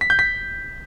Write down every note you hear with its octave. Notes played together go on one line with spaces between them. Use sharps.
B6
G6
B6